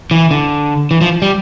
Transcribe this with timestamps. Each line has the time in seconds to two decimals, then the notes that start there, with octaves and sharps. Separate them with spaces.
0.11 E3
0.31 D3
0.91 E3
1.01 F3
1.22 G3